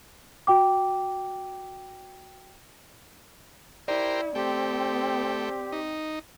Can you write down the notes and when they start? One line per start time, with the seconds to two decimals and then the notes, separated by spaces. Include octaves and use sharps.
0.47 F#4 G5 D6
3.88 E4 G4 A#4 C5 D5
4.35 A3 C4 G4 G5
5.72 D#4